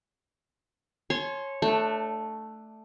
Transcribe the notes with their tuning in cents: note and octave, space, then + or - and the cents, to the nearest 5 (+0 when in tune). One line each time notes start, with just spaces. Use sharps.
C#5 -15 G#5 +45 C6 +0
A3 +0 D4 +20